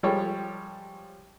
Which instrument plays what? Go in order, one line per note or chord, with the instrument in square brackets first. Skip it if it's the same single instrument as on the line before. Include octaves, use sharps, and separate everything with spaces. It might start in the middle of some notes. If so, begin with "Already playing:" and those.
[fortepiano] F3 G3 G#3 G4 A4 C#5